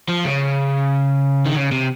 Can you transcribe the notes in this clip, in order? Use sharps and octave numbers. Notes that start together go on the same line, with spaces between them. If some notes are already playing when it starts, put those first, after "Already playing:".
F3
C#3
D#3
C#3
C3